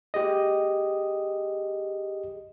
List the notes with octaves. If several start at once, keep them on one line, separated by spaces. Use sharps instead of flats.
G4 G#4 D#5